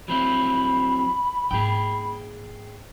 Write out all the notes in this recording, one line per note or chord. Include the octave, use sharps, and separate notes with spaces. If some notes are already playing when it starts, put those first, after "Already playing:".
F#3 C4 E4 B5
G#2 A#3 G#4 G5